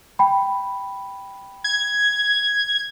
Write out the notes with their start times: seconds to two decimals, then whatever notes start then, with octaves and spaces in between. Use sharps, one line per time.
0.19 G5 B5
1.64 G#6